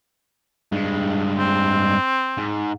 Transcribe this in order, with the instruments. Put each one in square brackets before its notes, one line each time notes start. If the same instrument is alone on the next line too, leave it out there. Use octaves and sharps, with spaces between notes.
[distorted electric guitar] G2 G#3
[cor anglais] C4
[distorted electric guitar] G#2